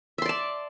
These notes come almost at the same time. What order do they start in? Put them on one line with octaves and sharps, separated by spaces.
E5 C6 D5 A5